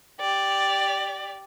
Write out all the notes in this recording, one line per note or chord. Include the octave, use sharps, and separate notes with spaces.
G4 D5